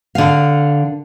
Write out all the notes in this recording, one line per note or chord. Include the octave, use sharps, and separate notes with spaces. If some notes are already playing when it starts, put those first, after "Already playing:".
D3 F5